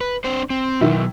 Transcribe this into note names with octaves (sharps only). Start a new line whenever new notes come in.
B4
C4 D4 C5
C4
B2 D#3 F#3 E4